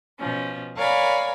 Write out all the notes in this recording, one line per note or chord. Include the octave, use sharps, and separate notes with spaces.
B2 F3 C#4
A#4 C#5 D5 F5 G#5 B5